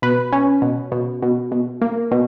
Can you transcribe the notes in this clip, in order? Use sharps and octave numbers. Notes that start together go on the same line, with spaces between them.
B2 B4
C#4
B2
B2
B2
B2
A#3
B2